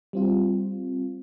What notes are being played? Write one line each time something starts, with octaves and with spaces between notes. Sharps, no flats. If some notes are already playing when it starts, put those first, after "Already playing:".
G3 C4 F4